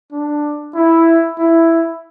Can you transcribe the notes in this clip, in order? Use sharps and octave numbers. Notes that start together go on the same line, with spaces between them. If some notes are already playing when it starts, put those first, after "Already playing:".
D4
E4
E4